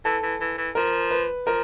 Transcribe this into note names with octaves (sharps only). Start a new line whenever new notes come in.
E3 A4
E3
E3
E3
F3 A#4
B4
F3 A#4